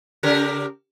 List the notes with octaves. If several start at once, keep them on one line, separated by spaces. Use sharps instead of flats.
C#3 G4 A#4